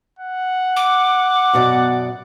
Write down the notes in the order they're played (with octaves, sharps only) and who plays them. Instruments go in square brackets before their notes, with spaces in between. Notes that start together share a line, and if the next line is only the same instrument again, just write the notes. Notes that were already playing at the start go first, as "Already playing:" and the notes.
[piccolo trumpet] F#5
[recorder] D6
[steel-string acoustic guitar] F#2 B2 D5